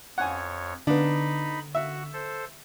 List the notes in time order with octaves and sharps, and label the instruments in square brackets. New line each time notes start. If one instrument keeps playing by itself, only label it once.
[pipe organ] F2 C#5 [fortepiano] F#5 G#5
[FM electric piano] D3 [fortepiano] B3 D4 [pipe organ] D#4 B5
[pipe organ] F#4 [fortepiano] E5
[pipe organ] A4 C5